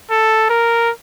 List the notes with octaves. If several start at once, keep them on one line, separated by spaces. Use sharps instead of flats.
A4
A#4